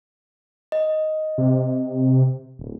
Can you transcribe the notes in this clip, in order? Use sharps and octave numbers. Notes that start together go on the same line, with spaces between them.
D#5
C3
D1